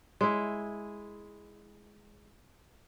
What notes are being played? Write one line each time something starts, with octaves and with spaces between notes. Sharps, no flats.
G#3 E4